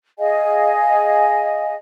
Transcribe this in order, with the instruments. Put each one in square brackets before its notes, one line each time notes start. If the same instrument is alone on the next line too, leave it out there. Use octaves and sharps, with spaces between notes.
[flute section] G#4 D#5 F5 G#5